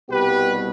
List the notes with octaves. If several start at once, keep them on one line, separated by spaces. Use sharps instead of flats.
C2 B2 G3 B3 G4 B4